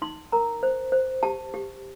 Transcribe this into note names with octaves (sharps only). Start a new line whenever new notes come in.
D#4 C6
A#4 A#5
C5
C5
G4 A5
G4